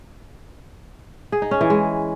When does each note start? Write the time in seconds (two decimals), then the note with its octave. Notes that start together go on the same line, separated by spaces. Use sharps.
1.32 G#4
1.42 D#4
1.51 C#4
1.61 E3
1.70 G#3